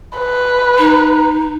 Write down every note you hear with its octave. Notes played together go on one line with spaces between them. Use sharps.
B4
D#4